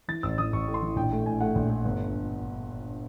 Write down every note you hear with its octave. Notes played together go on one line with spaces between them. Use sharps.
E3 A6
A1 E6
E3 D#6
A1 C#6
A2
C6
E3
A#1 G5
A3
A2 G#5
A3 F#5
A#1
A3
G1